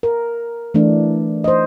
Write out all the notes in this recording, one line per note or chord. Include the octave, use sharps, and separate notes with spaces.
A#4
E3 A3 D4
C5 D#5